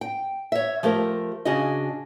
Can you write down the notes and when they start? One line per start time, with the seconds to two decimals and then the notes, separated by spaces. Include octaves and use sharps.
0.01 G5
0.52 C#5 E5
0.83 F3 A3 G4 A#4
1.45 C#3 D4 F#4 G#4 D#5